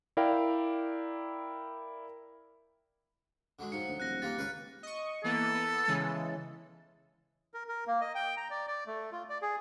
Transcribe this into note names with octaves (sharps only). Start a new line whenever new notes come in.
E4 A#4 D5 F5 G5
D3 F#3 G#3
G#2 F3 F#3 C#7
D2
D#1 F#6 A#6
A#3 F4 G4 A6
C#2 B4 F5 C#6
D#5 C#6
E3 A#3 B3 A4
B3
C#3 E3 G#3
A#4
A#4
A#3
D#5
G5
A#5
D5
D5
A3
F4
D5
G#4